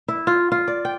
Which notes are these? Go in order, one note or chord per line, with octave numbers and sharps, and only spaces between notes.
E4
F4
F4
D5
G5